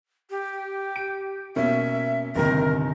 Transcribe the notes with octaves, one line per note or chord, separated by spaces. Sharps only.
G4
D7
B2 A#3 C#4 E5
G1 C3 D#3 A#4